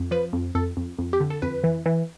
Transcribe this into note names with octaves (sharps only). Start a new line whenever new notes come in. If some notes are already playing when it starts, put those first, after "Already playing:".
Already playing: F2
F3 B4
F2
F2 A4
F2
F2
G4
D3
A4
F2 B4
E3
E3